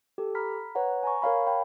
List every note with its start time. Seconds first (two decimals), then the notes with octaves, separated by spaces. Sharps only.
0.18 G4 A4
0.35 A#5 B5 F6 B6
0.75 B4 C#5 F#5 A#5
1.03 G#5 A#5 C#6
1.22 A#4 C#5 F5 B5
1.47 G5 A5 B5